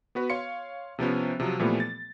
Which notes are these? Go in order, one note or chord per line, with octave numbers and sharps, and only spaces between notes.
B3 F#4 B4
C#5 F5 C6 C#7
C3 F3 B3 C#4
C3 F3 F#3
A#2 E3 F3 G3 A3 B3
A6